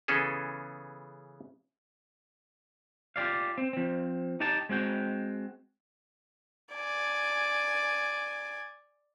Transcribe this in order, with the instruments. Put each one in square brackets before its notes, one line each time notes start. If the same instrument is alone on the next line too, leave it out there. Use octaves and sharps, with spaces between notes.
[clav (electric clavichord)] C#3 E3 B3 C#4 G#4 A4
[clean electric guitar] F4 G4 G#4 D5 F5
C4
F3 C4
D#4 G4 G5 A5
G#3 C4 F#4 G5
[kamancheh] D5 G#5